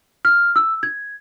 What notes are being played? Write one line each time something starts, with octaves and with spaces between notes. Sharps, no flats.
F6
E6
G#6